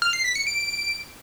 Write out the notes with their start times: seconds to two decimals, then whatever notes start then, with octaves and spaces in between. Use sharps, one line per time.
0.02 F6
0.13 C7
0.24 B6
0.36 C#7
0.47 D7